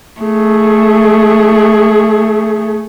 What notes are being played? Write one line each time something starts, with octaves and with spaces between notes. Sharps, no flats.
A3 G#4